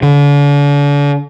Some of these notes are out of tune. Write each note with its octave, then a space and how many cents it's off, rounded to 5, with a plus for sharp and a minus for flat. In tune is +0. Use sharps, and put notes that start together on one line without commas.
D3 -40